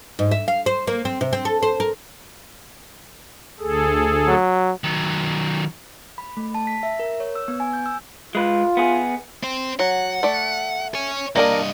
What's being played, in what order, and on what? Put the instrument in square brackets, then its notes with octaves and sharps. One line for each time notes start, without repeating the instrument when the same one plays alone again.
[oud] G#2
E5
F5
C5
A#3
C4
C3
C4
A4
C5
A#4
[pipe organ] D2 G#4 A4
[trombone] F#3
[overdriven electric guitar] D#3 F#3
[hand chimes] B5
A3
A5
B6
E5
A#4
C#5
E6
B3
G#5
G6
E6
[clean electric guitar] G#3 B4 [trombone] F4
[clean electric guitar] B3 G#4
[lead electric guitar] C4 C5
[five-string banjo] F#3 [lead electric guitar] F#5
[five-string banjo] A3 D5
[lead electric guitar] C#5 G#5
[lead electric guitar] G2 D#5 [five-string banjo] A#3 D4 A#4